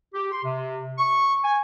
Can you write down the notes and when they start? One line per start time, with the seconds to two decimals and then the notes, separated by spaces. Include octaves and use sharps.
0.15 G4
0.32 C6
0.44 C3
0.99 C#6
1.44 G#5